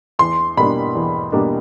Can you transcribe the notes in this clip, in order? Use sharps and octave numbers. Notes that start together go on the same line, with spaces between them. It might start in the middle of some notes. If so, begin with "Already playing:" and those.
E2 C6
B2 G3 A#3 D4 B5
E2
B2 G3 A#3 D4